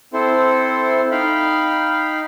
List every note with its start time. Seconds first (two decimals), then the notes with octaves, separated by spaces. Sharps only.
0.13 C4 E4 A4 C5
1.11 D#4 F5 G5 B5